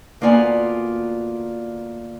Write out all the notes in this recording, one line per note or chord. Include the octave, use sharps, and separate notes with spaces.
D2 A#3 B3 F4 D5 G#5